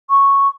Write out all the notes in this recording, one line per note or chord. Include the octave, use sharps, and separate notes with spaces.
C#6